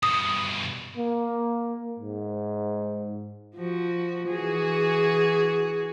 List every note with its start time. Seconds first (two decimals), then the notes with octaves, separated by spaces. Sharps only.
0.03 G2 B2 D#6
0.97 A#3
1.99 G#2
3.56 F3 F#4
4.29 E3 F#4 G#4